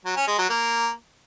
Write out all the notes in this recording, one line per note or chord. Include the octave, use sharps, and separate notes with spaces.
F#3
C#4
G#3
F#3
A#3